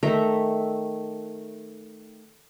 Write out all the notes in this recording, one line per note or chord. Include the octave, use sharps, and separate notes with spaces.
D#3 A3 E5 A#5